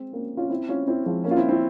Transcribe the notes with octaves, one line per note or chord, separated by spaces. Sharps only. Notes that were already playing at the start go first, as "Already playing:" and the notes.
Already playing: G#3 C4
A#3 C#4
C#4 F4
C4 E4
C#4 F4
C4 E4
F3 G#3
A#3 C#4
F4
C4 E4
C4 E4